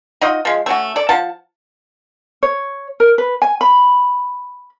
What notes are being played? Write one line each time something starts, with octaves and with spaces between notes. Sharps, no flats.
D#4 F4 F#4 D#5
F3 G#3
A3 C#4 F#4
A4 D5
F3 F#5 A5
C#5
A#4
B4
G#5
B5